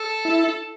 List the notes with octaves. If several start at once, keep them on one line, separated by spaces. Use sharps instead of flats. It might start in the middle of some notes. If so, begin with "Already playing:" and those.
Already playing: A4
E4